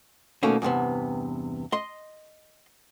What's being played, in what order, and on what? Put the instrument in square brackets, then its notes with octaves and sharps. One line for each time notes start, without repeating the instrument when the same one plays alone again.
[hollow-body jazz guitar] B2 D#3 A3 A#3 C#4
E2 G2 C3 B3
D#5 C6